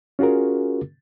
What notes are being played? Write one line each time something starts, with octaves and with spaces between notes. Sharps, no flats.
C#4 F4 F#4 G#4 A#4